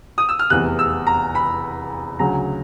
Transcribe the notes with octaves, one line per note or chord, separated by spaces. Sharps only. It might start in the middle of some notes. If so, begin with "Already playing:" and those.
D#6
E6
F6
F1 E2 C3 F#6
E6
A#5
B5
D2 C#3 F#3 A#5